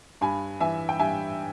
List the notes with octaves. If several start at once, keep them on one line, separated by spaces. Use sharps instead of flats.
G2 G#5 B5
E3 E5 G#5
G5
G2 E5 G#5